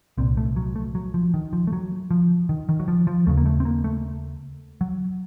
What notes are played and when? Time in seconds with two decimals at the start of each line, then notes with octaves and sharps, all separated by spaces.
0.18 C2 A#2 C4
0.37 A3
0.56 F#3
0.76 A3
0.95 F#3
1.14 F3
1.34 D#3
1.53 F3
1.67 A3
1.73 F#3
2.11 F3
2.49 D#3
2.69 D#3
2.80 F#3
2.88 F3
3.07 F3
3.27 D#2 C#3 A3
3.37 A#3
3.46 A3
3.60 C4
3.65 A#3
3.84 A3
4.81 F#3